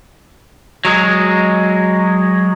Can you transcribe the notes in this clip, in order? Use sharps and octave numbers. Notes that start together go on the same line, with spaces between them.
F#3 G#3